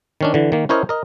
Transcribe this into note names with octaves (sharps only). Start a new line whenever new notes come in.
D#3 C#4 D4
D3 E3
D#3 A#3
C#4 E4 A#4 C5 C#5 D#5
A#4 D#5